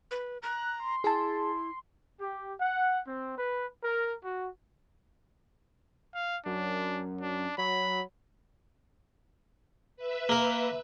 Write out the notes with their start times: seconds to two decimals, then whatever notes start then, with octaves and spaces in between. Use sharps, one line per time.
0.11 B4
0.42 A#5 F#6
0.80 C6
1.04 E4 G#4 A5
2.20 G4
2.60 F#5
3.07 C4
3.38 B4
3.84 A#4
4.24 F#4
6.15 F5
6.46 F#2 D4
7.21 D4
7.58 F#3 B5
9.97 B4 E5
10.29 A#3 A#4